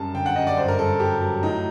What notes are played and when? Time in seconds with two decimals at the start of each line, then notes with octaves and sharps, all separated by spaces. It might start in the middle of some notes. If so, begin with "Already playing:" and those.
Already playing: F#2 G3 A5
0.14 D3 G5
0.26 F#5
0.36 F#2 D#5
0.47 D5
0.57 G2 C5
0.68 A#4
0.78 G2 A4
1.00 F#3 G4
1.21 F#3
1.43 A2 D#4